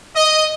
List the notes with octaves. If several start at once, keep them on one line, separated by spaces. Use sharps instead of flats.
D#5